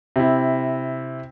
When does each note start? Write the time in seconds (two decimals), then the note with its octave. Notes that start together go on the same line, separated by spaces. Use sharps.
0.16 C3 E4